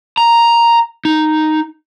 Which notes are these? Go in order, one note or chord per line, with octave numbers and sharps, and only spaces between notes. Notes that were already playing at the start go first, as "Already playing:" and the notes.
A#5
D#4